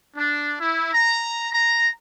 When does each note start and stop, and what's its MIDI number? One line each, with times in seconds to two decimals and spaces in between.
0.17 0.55 62
0.60 0.93 64
0.94 1.51 82
1.53 1.90 82